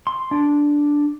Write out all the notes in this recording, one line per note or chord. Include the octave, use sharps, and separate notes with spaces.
C6
D4